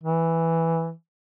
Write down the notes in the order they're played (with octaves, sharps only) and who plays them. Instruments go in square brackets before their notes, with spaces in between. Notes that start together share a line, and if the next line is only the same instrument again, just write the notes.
[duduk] E3